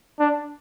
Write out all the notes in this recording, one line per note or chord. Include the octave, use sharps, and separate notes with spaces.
D4